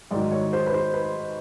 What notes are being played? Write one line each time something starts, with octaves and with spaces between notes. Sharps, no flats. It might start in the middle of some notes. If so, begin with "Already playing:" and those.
G#2 D#3 F#3 D5
C#5
C5
B4
C5
B4